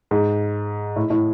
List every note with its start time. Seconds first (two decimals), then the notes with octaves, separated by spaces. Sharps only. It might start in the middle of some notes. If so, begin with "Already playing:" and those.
0.11 G#2
0.96 A2
1.10 A2